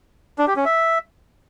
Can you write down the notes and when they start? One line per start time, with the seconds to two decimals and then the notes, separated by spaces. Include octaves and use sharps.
0.38 D4
0.47 G4
0.56 C#4
0.65 E5